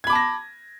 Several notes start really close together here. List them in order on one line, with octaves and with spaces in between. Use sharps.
G#6 B5 D6 A5 A#6